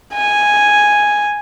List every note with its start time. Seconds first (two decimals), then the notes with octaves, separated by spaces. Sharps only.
0.14 G#5